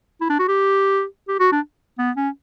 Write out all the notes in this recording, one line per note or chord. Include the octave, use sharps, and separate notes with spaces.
E4
D4
F#4
G4
G4
F#4
D4
B3
C#4